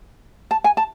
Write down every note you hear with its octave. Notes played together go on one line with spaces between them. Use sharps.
A5
G#5
A5